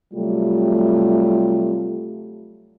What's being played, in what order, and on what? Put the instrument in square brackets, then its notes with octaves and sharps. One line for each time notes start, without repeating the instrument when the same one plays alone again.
[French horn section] C3 F#3 G3 A3 F4 G4